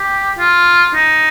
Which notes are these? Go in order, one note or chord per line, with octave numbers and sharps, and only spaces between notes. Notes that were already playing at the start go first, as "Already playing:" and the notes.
Already playing: G4
F4
D#4